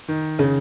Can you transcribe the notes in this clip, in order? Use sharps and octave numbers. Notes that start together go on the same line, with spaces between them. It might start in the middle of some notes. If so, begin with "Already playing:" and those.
D#3
C#3